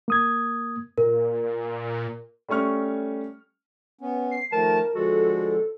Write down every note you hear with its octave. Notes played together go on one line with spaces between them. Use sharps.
A#3 D#6 G#6
A#2 A#4
G3 A3 C#4 C#6 F6
B3 C#4
C7
D#3 F3 A3 A#4 A5
D3 F3 G#3 F#4 A4